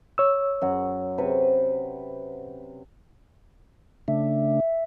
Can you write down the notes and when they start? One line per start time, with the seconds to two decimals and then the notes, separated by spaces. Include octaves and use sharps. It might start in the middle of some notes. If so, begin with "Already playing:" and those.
0.18 C#5 E6
0.62 F#2 F#5
1.18 C3 B4 C#6
4.08 C#3 A3 D4 E5